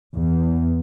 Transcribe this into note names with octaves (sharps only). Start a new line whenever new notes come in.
E2